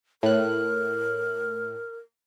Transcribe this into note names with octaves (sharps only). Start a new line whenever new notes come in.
A2 A#4 F#6